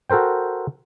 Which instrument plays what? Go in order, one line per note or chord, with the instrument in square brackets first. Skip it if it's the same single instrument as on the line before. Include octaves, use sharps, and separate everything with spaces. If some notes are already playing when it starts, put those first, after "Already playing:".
[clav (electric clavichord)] F#4 A4 A#4 C5 G5